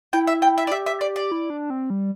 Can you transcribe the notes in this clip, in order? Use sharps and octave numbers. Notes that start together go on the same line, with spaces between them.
E4 G5
E5
G5
E5
D5
G4 E5
E5
D5
D5
E4
D4
C4
G3